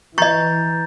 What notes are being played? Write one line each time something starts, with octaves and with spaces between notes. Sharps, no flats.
E3 D#5 A#5 C#6 G6 A6